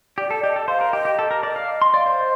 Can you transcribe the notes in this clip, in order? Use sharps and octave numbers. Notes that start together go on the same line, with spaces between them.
G4 D5
A4
G4 D#5
A4 D#5
C5 F5
A#4
G4 D#5
G4
A4
A#4
D5 D#5
F5
D#5
C6
D5 F5
C5
D#5